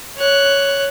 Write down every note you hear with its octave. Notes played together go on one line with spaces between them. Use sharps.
C#5 F#6